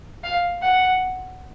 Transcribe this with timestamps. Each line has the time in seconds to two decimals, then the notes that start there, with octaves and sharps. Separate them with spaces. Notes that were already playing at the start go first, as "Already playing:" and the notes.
0.24 F5
0.62 F#5